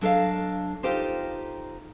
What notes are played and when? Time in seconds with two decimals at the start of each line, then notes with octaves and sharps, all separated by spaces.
0.01 F#3 D4 A4 D#5 F5
0.83 D#4 F4 G4 A4 C5